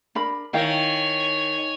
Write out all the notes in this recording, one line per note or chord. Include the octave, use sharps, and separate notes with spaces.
D4 A#4 B5
D#3 E4 C#5 F5 G5 G#5